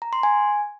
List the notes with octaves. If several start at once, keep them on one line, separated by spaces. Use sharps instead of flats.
A#5
C6
G#5